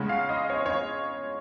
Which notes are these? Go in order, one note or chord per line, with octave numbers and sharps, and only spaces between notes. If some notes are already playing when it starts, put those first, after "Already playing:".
Already playing: C#3 G#3 C#4 F#5
F5
D#5
C#5
C#5